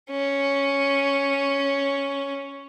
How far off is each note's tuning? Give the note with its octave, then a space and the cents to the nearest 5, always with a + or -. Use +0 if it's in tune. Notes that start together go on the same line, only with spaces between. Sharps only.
C#4 +0